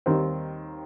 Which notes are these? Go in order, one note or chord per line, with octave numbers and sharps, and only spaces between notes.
D#2 D#3 G3 C4